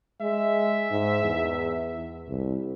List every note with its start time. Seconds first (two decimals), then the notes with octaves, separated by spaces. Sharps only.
0.21 G#3 E5
0.91 G#2
1.24 E2
2.28 C2